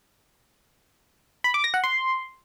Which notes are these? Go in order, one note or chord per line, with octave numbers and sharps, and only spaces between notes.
B5
D6
A#6
F#5
C6